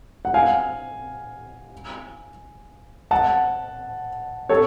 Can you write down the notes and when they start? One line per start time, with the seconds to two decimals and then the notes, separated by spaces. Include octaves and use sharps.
0.25 F#5
0.34 F5 G#5
3.11 F#5 A5
4.49 A4 C#5